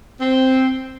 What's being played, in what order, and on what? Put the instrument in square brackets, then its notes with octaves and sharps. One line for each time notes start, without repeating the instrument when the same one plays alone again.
[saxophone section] C4